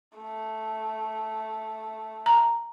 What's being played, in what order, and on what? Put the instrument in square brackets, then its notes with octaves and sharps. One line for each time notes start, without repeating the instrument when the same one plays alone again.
[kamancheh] A3
[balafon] A#5